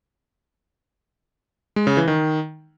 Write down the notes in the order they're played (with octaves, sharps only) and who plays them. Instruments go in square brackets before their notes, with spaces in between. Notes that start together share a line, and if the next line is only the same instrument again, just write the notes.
[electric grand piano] G#3
C#3
E3
D#3